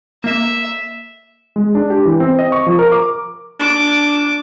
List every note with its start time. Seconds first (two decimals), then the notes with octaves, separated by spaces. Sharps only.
0.24 A#3 E5 E7
1.56 G#3
1.75 D4
1.90 G4
2.05 E3
2.20 C4
2.39 D#5
2.52 C#6
2.66 F3
2.79 A#4
2.92 D6
3.60 D4 D6